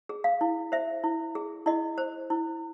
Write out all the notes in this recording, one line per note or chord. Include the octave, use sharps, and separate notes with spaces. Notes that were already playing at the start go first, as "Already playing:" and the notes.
G#4
F5
E4
C5 E5
E4
G#4
E4 D#5
C5
E4